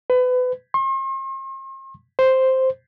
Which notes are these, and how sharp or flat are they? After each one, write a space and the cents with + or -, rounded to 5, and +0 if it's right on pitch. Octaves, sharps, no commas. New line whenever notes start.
B4 +30
C6 +45
C5 +0